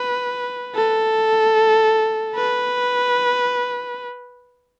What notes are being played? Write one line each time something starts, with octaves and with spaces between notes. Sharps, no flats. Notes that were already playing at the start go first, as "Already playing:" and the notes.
Already playing: B4
A4
B4